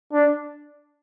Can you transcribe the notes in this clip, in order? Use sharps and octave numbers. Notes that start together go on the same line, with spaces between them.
D4